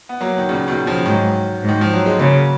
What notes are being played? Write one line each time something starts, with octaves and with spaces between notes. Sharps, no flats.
B3
F#3 A#3
D#3
A#2 C#3
B2 D#3
C#3 F3
G#2 D#3 F#3
G#2
D#3
F3
F#3
G#3
C#3 F#3 A#3